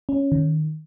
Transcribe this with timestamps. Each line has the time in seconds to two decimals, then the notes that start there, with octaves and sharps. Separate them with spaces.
0.09 C#4
0.32 D#3